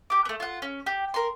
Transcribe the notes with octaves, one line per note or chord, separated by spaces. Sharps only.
G4 D6
A3 B3
F4 F#5
C#4
G4
A#4 C6